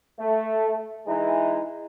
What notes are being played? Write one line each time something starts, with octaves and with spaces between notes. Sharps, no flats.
A3
E3 G#3 D#4 E4